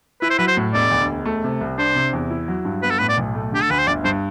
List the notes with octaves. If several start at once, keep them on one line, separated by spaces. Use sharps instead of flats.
E4 B4
C5
F#3 B4
C5
A2
E1 D5
D2
E1
A3
C3
C2
D4 C5
C3
E2
E4
F#3
G2
B3 B4
A4
A2 B4
D5
B1
A3
D3 G4
A4
D2 B4
C5
G1 D5
G2 C5